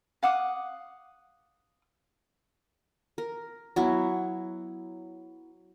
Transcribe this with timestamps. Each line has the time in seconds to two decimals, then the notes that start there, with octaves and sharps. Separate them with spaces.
0.23 F5 F#5 D6 D#6
3.18 A#4
3.76 F#3 B3 E4